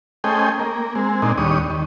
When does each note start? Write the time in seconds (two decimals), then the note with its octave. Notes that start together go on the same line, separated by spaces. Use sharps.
0.24 A3 C#4 G#4 C5 D#5 G5
0.59 A#3
0.95 G#3 C4
1.22 A#2 G#3 C4 D4 D#4
1.38 D#2 G3 D4 C#5 D#6
1.70 D#3